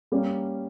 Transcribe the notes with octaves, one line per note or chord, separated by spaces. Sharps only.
G3 A#3 C#4